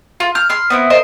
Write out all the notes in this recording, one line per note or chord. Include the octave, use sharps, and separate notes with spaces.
F4
F6 G6
B5 C6 F6
B3 C4 E4
A#4 C5 D#5